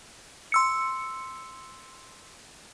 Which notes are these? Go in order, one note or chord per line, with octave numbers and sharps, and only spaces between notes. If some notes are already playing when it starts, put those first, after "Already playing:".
C6 E6 C#7